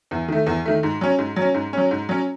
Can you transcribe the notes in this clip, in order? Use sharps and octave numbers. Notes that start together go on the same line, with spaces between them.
E2
D#3 A3
E2
D#3 A3
G#2
F#3 C#4
G#2
F#3
C#4
G#2
F#3 C#4
G#2
F#3 C#4